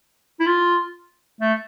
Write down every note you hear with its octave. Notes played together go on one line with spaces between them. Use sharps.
E4
F4
A3